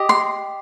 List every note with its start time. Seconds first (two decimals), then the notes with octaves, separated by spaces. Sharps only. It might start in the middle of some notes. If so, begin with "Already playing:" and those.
Already playing: G4 D#5
0.09 C6